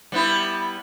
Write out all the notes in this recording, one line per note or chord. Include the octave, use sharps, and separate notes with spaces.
G3 B3 E4